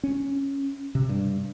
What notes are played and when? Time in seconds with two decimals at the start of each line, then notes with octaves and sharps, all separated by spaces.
0.03 C#4
0.95 C3
1.09 G2